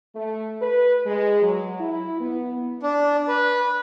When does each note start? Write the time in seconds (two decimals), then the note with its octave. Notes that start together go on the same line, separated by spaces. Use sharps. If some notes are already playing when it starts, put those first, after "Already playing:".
0.15 A3
0.62 B4
1.06 G#3
1.42 F#3
1.79 E4
2.20 B3
2.83 D4
3.28 B4